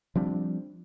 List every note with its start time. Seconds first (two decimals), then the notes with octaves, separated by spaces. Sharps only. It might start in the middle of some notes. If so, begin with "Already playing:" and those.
0.15 F3 G3 C4 D4